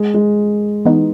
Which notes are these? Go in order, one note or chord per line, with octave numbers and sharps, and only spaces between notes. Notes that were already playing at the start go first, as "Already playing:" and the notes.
Already playing: G#3
G#3
E3 B3 D#4